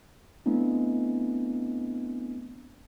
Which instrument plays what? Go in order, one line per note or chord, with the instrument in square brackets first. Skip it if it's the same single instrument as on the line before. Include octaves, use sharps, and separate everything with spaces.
[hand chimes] A3 B3 C4 D4 E4